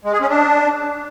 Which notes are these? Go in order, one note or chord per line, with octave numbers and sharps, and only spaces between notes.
G#3
G#4
C#4
D4